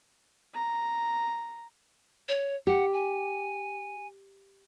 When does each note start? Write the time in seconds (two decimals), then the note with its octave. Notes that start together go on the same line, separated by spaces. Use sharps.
0.55 A#5
2.29 C#5
2.67 G4 F#5
2.93 G#5